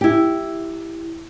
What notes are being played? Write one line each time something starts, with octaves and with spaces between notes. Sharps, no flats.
E4 G4